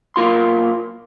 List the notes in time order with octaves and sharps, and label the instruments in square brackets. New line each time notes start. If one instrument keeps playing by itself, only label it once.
[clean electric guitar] B1 A#2 A#3 F4 C6